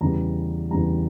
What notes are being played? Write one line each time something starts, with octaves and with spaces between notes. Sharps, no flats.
E2 C#3 E3 G3 A#5
E2 C#3 E3 G3 A#5